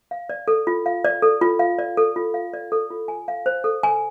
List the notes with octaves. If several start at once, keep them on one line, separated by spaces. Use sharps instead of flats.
F5
D5
A4
F4
F5
D5
A4
F4
F5
D5
A4
F4
F5
D5
A4
F4
G#5
F5
C5
A4
G#5